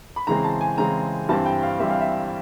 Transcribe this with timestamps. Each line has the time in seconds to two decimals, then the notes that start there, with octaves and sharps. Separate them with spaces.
0.16 B5
0.27 C#3 E3 G#3 C4 A#5
0.44 A5
0.61 G#5
0.78 C#3 E3 G#3 C4 A#5
1.29 G2 E3 G3 C4 A5
1.46 G5
1.63 F5
1.80 G2 E3 G3 C4 E5
1.90 F5
2.01 E5